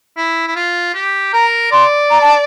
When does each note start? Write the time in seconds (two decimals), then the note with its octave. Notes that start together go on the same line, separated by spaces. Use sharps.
0.17 E4
0.47 E4
0.56 F4
0.94 G4
1.33 A#4 A#5
1.71 D5 C6
2.10 A#5
2.21 A5